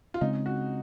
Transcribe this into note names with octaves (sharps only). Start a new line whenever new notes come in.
F4
C#3 G#3 C4 D#4
F#4